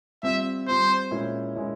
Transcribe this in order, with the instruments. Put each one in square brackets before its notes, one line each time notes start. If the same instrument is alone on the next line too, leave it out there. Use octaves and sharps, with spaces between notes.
[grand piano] G3 C4 F4 [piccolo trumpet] E5
[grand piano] G3 C4 F4 [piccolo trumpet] C5
[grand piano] A#2 G#3 C#4 E4
A#2 G#3 C#4 E4